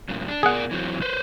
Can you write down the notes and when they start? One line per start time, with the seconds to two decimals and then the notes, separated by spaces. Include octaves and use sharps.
0.09 F#2 A2 C#3
0.28 D4
0.43 B2 G#4 A#4 D5 F#5
0.71 E3 F#3 C4
1.02 B4 C5